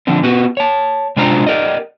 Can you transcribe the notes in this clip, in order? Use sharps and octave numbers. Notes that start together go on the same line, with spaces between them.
D3 F3 A#3 C4 D4
B3 F#4 G4 B4
C#5 A5
C3 G#3 D4 F4 C5 A#5
G4 A#4 D5 D#5